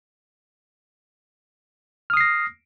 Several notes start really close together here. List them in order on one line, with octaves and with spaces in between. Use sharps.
F6 D#6 C7 A#6